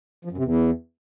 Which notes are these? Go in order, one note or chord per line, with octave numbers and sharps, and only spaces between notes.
F3
F#2
C3
E2